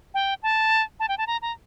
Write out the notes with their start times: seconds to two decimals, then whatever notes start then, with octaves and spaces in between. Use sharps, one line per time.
0.14 G5
0.43 A5
1.00 A5
1.09 G5
1.18 A5
1.27 A#5
1.42 A#5